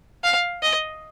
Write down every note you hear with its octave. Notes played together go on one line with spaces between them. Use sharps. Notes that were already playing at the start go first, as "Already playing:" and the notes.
F5
D#5